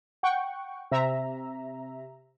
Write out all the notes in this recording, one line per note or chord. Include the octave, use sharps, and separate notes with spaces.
F#5 G5 C#6
C3 E5 A#5